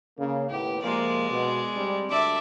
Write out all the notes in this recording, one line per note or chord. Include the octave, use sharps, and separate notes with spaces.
C#3 A#3
D#2 A2 B3 G4
C3 F3 G#3 A#3 D5
B2
G3 C4 D4
D2 D3 A4 D5 E5